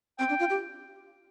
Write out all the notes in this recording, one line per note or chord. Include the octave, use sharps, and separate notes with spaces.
C4 G5
D4
F4
G4